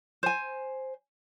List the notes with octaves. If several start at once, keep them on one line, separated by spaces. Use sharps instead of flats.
C5 G#5